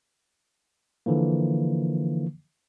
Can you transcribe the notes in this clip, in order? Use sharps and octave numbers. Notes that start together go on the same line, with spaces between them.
D3 E3 F3 A#3